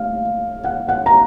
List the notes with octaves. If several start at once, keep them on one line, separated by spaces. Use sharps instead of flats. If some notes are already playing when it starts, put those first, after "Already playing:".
Already playing: A3 F5
F#5
F#5
A#5